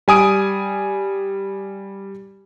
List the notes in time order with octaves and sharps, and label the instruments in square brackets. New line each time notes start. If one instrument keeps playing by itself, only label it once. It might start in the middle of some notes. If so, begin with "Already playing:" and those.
[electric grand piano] G3 G#5 D#6 D7